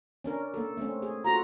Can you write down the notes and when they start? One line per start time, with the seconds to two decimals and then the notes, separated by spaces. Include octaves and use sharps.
0.24 C#4 D4 A#4
0.54 A#3 A4
0.77 A3 C4 C#4
1.02 G#4
1.24 F4 F#4 A4 A#5